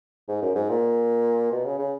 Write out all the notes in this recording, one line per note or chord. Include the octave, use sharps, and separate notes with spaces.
G#2
F#2
G#2
A#2
B2
C#3
C#3